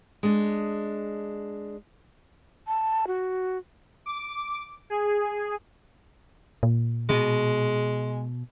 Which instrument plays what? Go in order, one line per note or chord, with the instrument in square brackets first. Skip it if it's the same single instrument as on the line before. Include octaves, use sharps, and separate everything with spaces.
[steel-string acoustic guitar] G#3 D4
[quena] A5
F#4
[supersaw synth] D6
G#4
[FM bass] A#2
[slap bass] B2 [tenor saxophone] G#3